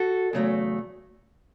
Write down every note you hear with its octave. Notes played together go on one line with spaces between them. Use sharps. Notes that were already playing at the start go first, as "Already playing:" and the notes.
Already playing: F#4 A4
E2 C#3 F#3 A3